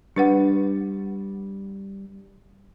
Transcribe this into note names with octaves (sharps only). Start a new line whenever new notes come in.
G3 D4 B4 F#5